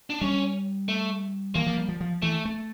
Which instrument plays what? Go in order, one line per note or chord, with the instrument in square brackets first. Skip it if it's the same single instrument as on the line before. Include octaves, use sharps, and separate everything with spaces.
[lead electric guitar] D4
[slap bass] G3 [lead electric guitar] C#4
[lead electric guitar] A3
[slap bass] E3 [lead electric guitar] A#3
[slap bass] F3
G3
F3
F3
[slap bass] E3 [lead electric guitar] A3
[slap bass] A3